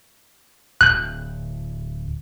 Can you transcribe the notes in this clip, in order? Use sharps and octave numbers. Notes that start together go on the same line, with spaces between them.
D1 F#6 G6